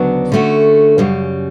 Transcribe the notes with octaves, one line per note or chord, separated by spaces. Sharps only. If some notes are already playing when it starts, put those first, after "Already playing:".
Already playing: D2 C#3 F#3 B3 D4
D3 A3 C#4 F#4
F#2 C#3 G3